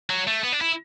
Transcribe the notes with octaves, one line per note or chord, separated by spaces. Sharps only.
F#3
A3
B3
D4
E4